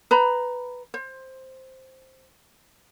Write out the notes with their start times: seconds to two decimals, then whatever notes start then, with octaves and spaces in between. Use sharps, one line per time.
0.11 B4 A#5 B5
0.94 C5